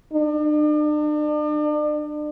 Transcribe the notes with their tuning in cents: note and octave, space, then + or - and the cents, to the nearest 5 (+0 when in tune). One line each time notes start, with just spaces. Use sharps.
D4 +40